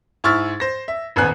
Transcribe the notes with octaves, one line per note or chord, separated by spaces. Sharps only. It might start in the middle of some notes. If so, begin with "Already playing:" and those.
G#2 E4 C#6 E6 F6 A6
C5 A#6
E5
D#1 G#1 B3 G#5 F#6